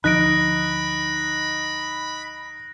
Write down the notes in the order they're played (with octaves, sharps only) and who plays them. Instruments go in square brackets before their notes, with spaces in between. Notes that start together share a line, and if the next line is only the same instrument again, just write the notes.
[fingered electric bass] D2 F3 [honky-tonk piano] D#4 [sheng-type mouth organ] B5 [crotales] F#6 A#6 D7